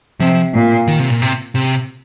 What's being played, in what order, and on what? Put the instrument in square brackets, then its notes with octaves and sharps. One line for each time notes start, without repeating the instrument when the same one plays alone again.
[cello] C3 [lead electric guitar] F3
[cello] A#2
[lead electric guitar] D#3
C3
A#2
C3
C3